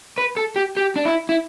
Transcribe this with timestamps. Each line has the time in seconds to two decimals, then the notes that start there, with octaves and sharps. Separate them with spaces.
0.18 B4
0.36 A4
0.56 G4
0.77 G4
0.96 D4
1.05 E4
1.29 E4